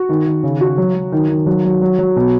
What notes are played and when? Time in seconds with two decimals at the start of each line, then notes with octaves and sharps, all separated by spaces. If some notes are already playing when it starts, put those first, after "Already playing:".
Already playing: F#4
0.09 D#3
0.26 D#3
0.43 C#3
0.61 F#4
0.78 F#3
0.95 F#3
1.12 D#3
1.29 D#3
1.46 F#3
1.65 F#3
1.81 F#3
1.99 F#3
2.16 B2